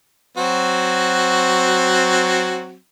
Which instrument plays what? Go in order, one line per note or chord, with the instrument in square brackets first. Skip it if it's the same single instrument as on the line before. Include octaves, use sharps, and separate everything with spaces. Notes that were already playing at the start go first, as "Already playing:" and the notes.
[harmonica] F#3 C4 F#4